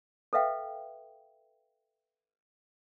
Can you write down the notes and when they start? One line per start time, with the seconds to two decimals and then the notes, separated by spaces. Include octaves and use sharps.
0.33 A4 B4 E5 F5 G5